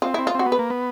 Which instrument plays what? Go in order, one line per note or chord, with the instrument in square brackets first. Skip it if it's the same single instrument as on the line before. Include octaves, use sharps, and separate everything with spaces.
[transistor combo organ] C4 [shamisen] F4
[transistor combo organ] C4 [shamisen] E4
[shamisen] F4
[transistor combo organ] C4 [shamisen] F#4
[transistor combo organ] B3
[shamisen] B4
[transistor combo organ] A#3
B3